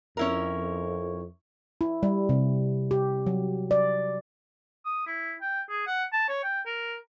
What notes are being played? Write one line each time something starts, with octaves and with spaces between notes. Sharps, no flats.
F2 C#4 E4 A#4
E4
G3
C3
G4
F#3
D5
D#6
E4
G5
G#4
F#5
A5
C#5
G5
A#4